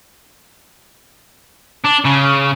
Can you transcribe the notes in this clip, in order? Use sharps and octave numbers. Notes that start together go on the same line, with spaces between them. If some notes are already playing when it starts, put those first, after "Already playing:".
D4
C#3